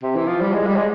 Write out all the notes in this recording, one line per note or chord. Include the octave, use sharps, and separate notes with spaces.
C3
E3
F3
G3
G#3
G3
G#3